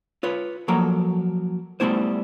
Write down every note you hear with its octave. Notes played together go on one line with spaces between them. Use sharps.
F4 B4 C#5
F3 F#3 A#3 A4 A#5
G3 A3 B3 E4 C5